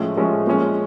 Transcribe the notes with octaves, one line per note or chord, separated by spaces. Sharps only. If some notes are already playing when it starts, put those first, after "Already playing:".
Already playing: A2 F3 G#3 C#4
A2 F3 G#3 C#4
A#2 F3 G#3 C#4